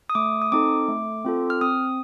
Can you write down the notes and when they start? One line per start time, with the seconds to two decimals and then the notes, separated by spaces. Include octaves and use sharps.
0.10 D#6
0.15 A3 D6
0.42 D#6
0.52 C4 D#4 A4 D6
0.88 A3
1.25 C4 F4 A4
1.50 F6
1.61 C4 D#6